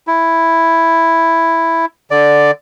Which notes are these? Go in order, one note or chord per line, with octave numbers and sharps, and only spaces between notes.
E4
D3 D5